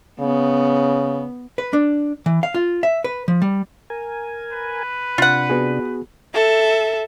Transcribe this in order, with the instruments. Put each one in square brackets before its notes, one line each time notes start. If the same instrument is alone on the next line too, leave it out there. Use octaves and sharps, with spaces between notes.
[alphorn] C#3 [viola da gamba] B3
[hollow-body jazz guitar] B4
D4
E3
F5
F4
E5
B4
F3
G3
[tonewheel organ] A#4 G#5
[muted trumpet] B4
[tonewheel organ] C3 D4 [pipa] F4 F#5
[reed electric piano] B3 F#4 G#4
[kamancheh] A4 E5